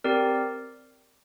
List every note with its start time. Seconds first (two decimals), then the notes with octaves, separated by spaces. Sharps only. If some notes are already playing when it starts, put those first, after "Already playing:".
0.04 C4 G4 A#4 D5